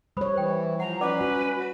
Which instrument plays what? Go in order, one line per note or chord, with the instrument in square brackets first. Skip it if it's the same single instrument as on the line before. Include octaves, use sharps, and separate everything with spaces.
[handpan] G3 C#5 [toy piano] C5 B5 D#6
[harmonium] E3 [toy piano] C5 G5
[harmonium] F3 [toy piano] F#5 [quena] A#5
[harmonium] C#4 [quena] B4 [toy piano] D5 F#5 D6
[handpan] F#4
[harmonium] F#4